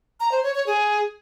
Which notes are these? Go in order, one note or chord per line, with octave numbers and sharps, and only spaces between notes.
A#5
C5
C#5
C#5
G#4